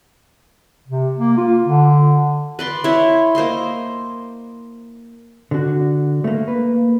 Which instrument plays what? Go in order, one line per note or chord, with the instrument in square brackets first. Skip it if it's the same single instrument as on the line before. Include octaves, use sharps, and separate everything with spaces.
[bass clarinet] C3
A#3
F4
D3
[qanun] B4 D5 C6
E4 C#5 C6
A#3 C5 D#5 C6
[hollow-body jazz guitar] D3 F#4
A3 A#3
[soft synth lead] A#3 [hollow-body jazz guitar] B4